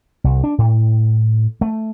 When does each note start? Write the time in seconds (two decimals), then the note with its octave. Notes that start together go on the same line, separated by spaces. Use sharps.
0.24 C2
0.44 D4
0.58 A2
1.61 A3